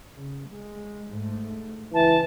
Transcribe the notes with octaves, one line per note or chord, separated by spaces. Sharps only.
C#3
G#3
G#2 A3
C#2 E3 A5